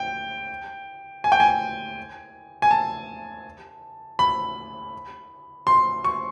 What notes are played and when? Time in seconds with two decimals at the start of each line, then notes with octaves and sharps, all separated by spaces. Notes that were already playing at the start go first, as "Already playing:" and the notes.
Already playing: G5
1.24 G#5
1.32 G5
1.40 G#5
2.62 G#5
2.71 A5
4.19 B5
5.67 C6
6.04 C#6